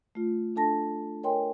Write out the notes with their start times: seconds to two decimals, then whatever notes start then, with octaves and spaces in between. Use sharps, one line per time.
0.15 A3 F4
0.56 D4 A4 A5 A#6
1.23 A#4 C#5 D#5 G5 G#5 C6